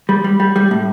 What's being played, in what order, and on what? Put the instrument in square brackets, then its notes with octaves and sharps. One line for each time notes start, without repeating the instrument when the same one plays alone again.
[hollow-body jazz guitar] G3
G3
G3
G3
A2